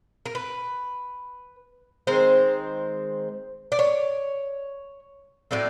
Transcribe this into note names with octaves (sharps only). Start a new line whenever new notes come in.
A#4
B4
D#3 G#3 C4 C5
D5
C#5
A2 F#3 A3 C4 D5